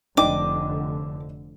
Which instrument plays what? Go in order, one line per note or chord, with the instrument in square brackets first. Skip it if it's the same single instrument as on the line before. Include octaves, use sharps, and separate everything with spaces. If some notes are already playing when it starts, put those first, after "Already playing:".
[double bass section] F1 D3 [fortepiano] D4 D#5 G5 [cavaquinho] D6